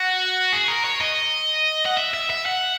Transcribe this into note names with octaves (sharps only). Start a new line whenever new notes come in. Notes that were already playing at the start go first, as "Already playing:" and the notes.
Already playing: F#4
G#4
A#4
C#5
D#5
F#5
E5
E5
E5
F#5